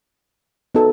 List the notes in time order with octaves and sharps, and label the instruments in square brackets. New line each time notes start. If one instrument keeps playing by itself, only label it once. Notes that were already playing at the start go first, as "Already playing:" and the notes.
[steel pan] B3 D#4 F#4 A4